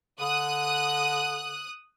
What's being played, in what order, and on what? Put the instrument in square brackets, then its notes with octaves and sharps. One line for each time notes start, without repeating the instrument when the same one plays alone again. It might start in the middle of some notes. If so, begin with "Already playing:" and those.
[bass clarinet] D3 [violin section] D#6 F#6